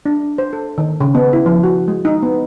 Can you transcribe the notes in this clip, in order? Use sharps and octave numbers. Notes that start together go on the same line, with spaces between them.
D4
C5
A4
D#3
C#3
B3
E4
F3
F#4
G#3
D#4
B3